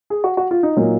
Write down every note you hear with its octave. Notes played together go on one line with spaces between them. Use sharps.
G#4
F#4
F#4
F4
D#4
A#2 F#3 A#3 D#4